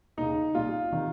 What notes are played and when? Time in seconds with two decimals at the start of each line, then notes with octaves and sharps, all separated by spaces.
0.17 D#2 C#3 D#4
0.55 C2 A#2 F4
0.92 C3 D#3